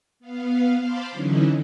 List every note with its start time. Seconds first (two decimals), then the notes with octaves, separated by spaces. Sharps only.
0.20 B3 F5
0.79 C5 F5 A5 B5 C6 D6
1.12 D3 E3 F#3 C#4 D#4 E4